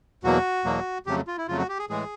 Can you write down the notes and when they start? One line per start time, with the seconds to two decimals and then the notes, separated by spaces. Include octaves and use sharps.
0.24 E2 B2 F#3 A#3 F#4
0.65 E2 B2 F#3 A#3
1.06 F2 C#3 F#3 A3 G4
1.27 F4
1.37 E4
1.48 F2 C#3 F#3 A3 F4
1.58 F#4
1.69 G4
1.79 G#4
1.89 A2 E3 G#3 G#4